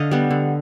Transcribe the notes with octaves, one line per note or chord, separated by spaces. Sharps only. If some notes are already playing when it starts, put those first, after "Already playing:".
Already playing: D3 D#5 F5
G3 B3
D3